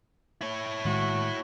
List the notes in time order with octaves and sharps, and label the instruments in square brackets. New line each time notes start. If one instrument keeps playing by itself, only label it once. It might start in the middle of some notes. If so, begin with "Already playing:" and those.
[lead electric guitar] E4 C#5
[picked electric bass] A2 D#3 G#3 [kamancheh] F#4